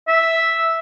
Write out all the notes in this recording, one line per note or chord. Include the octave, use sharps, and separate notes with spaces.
E5